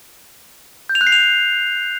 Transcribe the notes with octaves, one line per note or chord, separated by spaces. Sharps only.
G6
F7
F#6
C7
F7